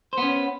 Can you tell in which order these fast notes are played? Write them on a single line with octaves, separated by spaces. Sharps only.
C5 B3 C#4